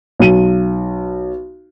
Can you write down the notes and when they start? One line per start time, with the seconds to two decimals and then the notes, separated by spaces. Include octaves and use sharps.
0.20 B1 D#7